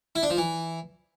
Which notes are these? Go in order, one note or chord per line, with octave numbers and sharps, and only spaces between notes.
E4
D4
F3
E3